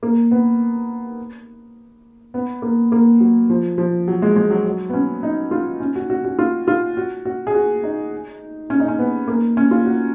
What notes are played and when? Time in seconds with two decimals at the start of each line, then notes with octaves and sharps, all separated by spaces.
0.03 A#3
0.31 B3
2.34 B3
2.62 A#3
2.92 A#3
3.20 F#3
3.50 F3
3.78 F3
4.08 F#3
4.22 G#3
4.36 G#3
4.50 F#3
4.65 F#3
4.90 B3
4.93 C#4
5.23 D#4
5.51 F4
5.80 C#4
5.95 F#4
6.10 F#4
6.24 F#4
6.39 F4
6.68 F4
6.97 F#4
7.25 F#4
7.47 G#4
7.54 F#4
7.84 D#4
8.70 C#4
8.80 D#4
8.88 C#4
8.99 B3
9.28 A#3
9.57 C#4
9.71 F4
9.86 F#4